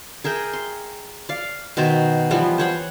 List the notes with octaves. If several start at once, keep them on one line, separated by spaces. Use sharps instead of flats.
G#4 A#4 E5 G5
C6
D5 F5
B2 D#3 C5 E5
E3 F3 G3 B3
C5 C#5 F#5